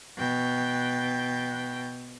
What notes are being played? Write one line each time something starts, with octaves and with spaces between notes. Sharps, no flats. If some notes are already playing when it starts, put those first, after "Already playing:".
B2 G5